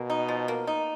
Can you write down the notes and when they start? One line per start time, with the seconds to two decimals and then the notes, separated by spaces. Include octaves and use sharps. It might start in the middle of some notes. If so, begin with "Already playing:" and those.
Already playing: B2 A#3
0.10 D#4
0.29 F3
0.48 A#3
0.67 D#4